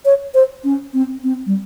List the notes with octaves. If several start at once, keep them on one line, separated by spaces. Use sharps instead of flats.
C#5
C5
C#4
C4
C4
G3